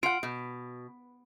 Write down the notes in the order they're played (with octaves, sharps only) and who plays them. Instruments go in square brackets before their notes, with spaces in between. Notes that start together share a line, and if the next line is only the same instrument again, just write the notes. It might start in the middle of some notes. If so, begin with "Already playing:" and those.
[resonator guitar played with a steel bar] F4 F#5 [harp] D7
[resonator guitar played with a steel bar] B2